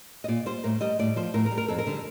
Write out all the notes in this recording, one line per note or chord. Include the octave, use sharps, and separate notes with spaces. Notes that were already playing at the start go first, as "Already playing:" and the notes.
D#5
A#2 D5
G3 C5
A2 A#4
G3 D#5
A2 D5
F3 C5
A2 A#4
A#4
G3
A#4
F2 A4
A#4
D3 G3